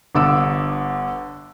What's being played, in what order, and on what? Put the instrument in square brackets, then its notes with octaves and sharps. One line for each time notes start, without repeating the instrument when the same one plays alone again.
[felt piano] G1 D3 D6 E6